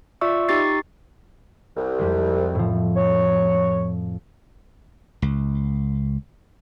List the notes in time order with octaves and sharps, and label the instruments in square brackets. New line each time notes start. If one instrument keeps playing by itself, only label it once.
[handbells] F4 D5 E5 C#6 E6
D#4 G4 C#6 A6 C7
[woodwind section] C2
[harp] F2 G3 G#3
A2 F3
[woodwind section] C#5
[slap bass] C#2